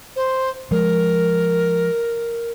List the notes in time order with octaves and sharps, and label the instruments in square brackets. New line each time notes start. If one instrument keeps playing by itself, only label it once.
[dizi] C5
[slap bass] F3 G#3 [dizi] A#4